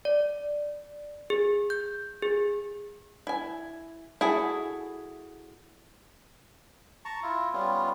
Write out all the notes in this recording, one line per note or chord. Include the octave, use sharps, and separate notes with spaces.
D5
G#4
G6
G#4
E4 G#5
E4 F#4 G#4 A4
A5 A#5 C#6
E4 F4
G3 B3 C#4 F4